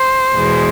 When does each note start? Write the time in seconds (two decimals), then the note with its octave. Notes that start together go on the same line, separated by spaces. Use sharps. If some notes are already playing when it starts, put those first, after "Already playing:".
Already playing: C5
0.35 E2 B2 G#3